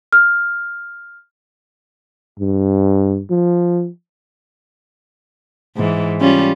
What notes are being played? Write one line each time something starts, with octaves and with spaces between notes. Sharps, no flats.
F6
G2
F3
G#2 E3
G3 C#4 F4